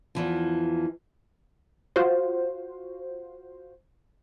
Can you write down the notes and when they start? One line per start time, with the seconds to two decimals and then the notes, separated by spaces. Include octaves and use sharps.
0.15 E2 E3 F3
1.96 F4 F#4 C5